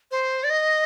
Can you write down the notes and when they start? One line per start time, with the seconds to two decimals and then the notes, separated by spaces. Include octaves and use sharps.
0.11 C5
0.44 D5
0.50 D#5